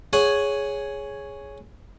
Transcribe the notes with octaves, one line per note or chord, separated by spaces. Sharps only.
G#4 C#5 F#5 G#5